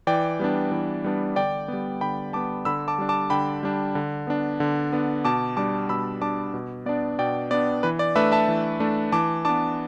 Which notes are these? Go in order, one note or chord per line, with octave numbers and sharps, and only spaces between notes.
E3 D5 G5
G3 B3 D4
E3
G3 B3 D4
D3 D5 G5
G3 B3
D3 G5 B5
G3 B3 A5 D6
D3 B5 E6
A5 D6
G3 D4
A5 D6
D3 G5 B5
G3 D4
D3
B3 D4
D3
B3 D4
B2 A5 D6
G3 D4 A5 D6
B2 B5 E6
G3 D4 A5 D6
B2
B3 D4 D5
B2 D5 G5
B3 D4 D5
E3 B4
D5
A3 D4 B4 E5
E5 A5
E3
A3 D4
E3 A5 D6
B3 D4 A5 D6